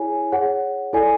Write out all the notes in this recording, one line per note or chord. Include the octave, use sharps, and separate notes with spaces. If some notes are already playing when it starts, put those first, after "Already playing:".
Already playing: E4 G#4 C#5 G#5
G#4 C#5 F#5
E4 A4 D5 G#5